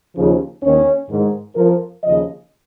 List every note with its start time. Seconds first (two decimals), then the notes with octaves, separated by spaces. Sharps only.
0.16 D#2 C#3 F3
0.63 D#2 D#3 C#4
1.10 G#2 D#3
1.56 F2 F3 A#4
2.04 D#2 C#3 F3 D#5